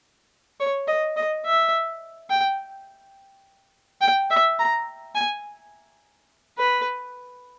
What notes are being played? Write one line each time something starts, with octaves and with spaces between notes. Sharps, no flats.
C#5
D#5
D#5
E5
G5
G5
E5
A#5
G#5
B4